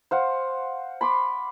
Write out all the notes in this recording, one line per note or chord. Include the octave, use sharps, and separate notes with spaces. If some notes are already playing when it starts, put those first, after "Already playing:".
C5 F5 F#5
B5 C6 D6